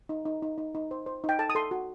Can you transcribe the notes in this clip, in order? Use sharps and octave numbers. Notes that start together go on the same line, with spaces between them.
D#4
D#4
D#4
D#4
D#4
C5
C5
D#4 G5
A4 A5
D#6
A4 C6
F#4